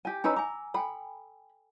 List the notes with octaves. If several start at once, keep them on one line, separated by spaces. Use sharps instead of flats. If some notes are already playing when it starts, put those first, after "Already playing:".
G4 G#5
C#4 D#4 B4 G#5 A#5 E6
G#5 A#5 D6
A4 G5 G#5 B5